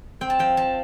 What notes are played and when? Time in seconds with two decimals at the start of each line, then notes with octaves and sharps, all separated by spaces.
0.21 C4 G5
0.30 A5
0.39 F3 G5
0.57 F3 A5